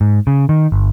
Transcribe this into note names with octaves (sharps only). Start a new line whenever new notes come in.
G#2
C#3
D#3
G1